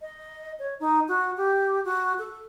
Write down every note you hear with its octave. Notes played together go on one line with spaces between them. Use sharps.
D#5
C#5
D#4
F#4
G4
F#4
A4